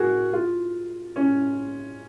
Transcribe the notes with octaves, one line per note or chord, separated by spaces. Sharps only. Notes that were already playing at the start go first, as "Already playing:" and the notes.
Already playing: F#4 G#4 A#4
F4
C#4